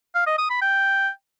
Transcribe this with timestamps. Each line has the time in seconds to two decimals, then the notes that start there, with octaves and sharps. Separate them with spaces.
0.15 F5
0.27 D#5
0.38 D#6
0.50 B5
0.61 G5